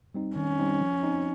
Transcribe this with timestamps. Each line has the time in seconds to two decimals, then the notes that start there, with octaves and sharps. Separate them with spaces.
0.14 G3 C4 D#4
0.36 D#3 C#4
0.59 G3 C4 D#4
0.81 F3
1.03 C4 D#4